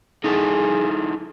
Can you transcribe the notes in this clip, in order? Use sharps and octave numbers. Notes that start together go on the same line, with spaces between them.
D#4 E4 G#4 A4